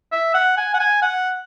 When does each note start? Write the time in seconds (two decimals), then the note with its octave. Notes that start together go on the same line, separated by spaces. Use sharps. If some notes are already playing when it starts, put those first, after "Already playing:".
0.12 E5
0.34 F#5
0.57 G#5
0.74 F#5
0.79 G#5
1.02 F#5